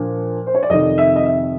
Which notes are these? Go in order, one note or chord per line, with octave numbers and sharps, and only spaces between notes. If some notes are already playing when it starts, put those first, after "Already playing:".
Already playing: A#2 F3 D4
C5
C#5
D5
F2 C3 D#3 D#5
E5
D#5
E5